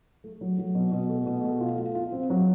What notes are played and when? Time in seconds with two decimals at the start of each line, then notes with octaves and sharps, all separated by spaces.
0.24 A3
0.41 F#3
0.58 F#3
0.75 B2
0.92 B2
1.09 A3
1.26 B2
1.43 A3
1.60 F4
1.78 F4
1.95 F4
2.12 C4
2.30 F#3